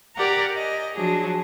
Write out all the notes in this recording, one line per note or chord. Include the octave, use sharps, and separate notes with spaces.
G4 A#4 D5 F#5 A#5
D#5 G#5
F3 F#3 D4 G#4